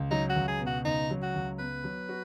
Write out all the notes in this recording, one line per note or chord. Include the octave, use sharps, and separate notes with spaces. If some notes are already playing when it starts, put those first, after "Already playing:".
Already playing: C#2
F#3 D#4
F#4
C#2
G#4
B2
F#4
C#2 D#4
F#3
F#4
C#2
B3 B4
F#3
F#4